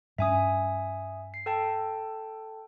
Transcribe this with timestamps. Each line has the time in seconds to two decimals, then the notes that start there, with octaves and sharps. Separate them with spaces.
0.18 G2 C#4 E5 G#5 D#6
1.34 C7
1.46 A4 G5 A5